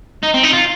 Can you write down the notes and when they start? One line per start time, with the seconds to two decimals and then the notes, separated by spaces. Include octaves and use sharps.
0.23 D#4
0.34 C4
0.43 D#4
0.53 F4